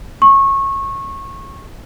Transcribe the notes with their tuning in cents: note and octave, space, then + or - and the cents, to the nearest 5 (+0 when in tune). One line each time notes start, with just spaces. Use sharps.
C#6 -20